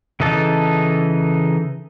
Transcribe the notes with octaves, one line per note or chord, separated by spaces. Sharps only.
C#3 E3 D#4 A4 A5